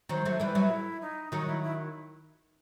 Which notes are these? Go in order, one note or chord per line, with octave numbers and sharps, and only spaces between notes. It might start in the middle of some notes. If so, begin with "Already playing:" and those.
D#3 F#3 C5
F#3 A3
E3 G3 B4 C5
F#3 A3
E4
D#4
D#3 F#3 D#4
E4
E4